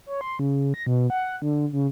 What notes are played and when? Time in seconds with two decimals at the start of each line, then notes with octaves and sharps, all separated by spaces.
0.06 C#5
0.21 C6
0.39 C#3
0.74 A#6
0.86 B2
1.10 F#5
1.42 D3
1.73 C#3